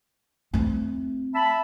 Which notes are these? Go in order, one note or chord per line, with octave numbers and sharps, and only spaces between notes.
A3 C4
E5 A5 B5